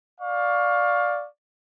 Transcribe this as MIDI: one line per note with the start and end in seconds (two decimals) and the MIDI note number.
0.21 1.26 74
0.21 1.26 77
0.21 1.26 85